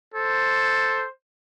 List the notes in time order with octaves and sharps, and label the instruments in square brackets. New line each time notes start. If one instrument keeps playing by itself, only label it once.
[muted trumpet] A4 [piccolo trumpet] C5